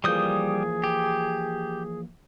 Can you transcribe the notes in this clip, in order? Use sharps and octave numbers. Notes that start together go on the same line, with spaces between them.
E3 F3 G3 A#3 G#4 D#6 G6
G4